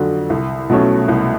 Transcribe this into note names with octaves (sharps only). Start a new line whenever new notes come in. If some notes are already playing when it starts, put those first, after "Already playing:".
Already playing: F2 D3 F#3
C2
B2 F#3 A3 C#4
C2